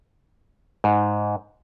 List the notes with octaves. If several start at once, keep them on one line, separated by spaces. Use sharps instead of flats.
G#2